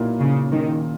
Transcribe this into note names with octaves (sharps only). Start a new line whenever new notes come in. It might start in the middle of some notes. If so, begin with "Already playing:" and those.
Already playing: B1 A#2 A#3 E4 A#4
C#3
D#3